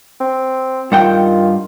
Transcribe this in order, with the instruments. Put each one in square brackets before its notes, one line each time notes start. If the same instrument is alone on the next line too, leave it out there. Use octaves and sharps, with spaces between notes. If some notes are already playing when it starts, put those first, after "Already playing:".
[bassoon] C4
[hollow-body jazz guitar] G2 F#5 G5 [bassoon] D#3 [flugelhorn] F4